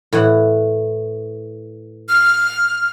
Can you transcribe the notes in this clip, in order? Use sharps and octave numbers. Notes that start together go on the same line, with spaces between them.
A2 E3 F#5
F6